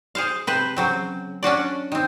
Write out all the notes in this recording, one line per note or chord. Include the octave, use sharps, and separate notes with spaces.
G#4 C5 F5
C3 B4 C5
C#3 F#3 C4
C#4 D4 F#4 D5
D#3 C4